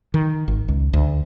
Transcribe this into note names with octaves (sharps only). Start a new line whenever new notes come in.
D#3
G#1
C#2
D2